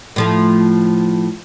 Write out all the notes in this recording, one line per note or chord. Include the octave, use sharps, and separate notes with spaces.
A2 F3 A3